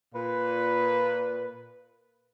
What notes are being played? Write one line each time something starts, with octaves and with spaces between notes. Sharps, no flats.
A#2 B4